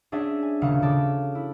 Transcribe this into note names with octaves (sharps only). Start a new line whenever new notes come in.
C#4 D4 G#4 E5 F#5
G#5
D#1 C#3 F#3 F5 F#5 C#7
C#3 A4 D6
E4